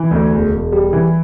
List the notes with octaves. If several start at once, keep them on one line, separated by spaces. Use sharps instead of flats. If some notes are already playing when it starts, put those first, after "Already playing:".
Already playing: E3
D2
E1
E1
G3
E3